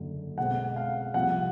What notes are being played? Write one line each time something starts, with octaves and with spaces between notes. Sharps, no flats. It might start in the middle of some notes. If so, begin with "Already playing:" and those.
Already playing: F#1 F#2 D3
B1 B2 G#3 C4 F#5
F5
C2 C3 F3 F#5